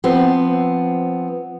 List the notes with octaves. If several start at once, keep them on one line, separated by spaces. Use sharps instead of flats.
F3 B3 C4